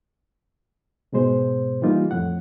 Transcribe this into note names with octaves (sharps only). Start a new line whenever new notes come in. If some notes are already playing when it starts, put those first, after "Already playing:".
G#2 B2 G#3 C5
E3 G3 A#3 D#4 F4
F2 A2 F#5